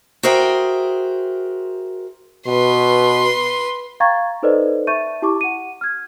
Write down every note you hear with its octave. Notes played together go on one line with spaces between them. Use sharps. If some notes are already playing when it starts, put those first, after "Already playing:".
F#4 G#4 A#4 C5 E5 G5
B2 B4 C6
F5 G5 A#5 C#6 G#6 A6
D#4 A4 B4 C5 D5 D#5
E5 A5 C#6 G6 A6 D#7
E4 G4 A5 C#6 D6
F#5 D#7
F6 G#6